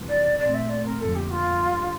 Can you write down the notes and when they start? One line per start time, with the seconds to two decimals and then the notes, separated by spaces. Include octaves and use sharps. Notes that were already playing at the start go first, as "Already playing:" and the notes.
Already playing: G1 F2 C3 E3 G3
0.09 D5
0.39 A#1 A#2 A3 C4 D5
0.54 E5
0.69 D5
0.85 A#4
1.00 F2 D3 F3 A#3 A4
1.15 G4
1.31 F4
1.62 G2 D3 G3